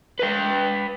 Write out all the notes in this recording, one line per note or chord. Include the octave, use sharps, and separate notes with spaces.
B4 G5